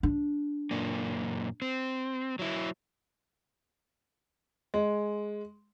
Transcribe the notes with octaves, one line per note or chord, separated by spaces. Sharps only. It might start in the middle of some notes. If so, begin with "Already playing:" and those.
D4
F#2 A#2 A#3
C4
F#3 E4
G#3